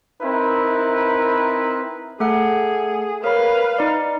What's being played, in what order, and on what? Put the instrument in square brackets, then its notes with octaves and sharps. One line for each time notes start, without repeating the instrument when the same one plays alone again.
[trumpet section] C4 D#4 E4 A#4 B4
[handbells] A3 A4 F#5 [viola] G#4
[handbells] A#4 C#5 B5 [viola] B4 F5
[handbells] D#4 D5